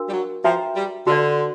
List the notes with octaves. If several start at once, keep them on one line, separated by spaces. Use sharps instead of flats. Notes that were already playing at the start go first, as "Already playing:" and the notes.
Already playing: D4 F#4 A#4 F5
G3
F#3
F3 F#4 B4 E5 G5 A#5
G3
D3 F#4 B4 D5